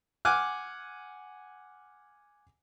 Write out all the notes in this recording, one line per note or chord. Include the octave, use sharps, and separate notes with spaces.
F#5 G#5 D6 F6 F#6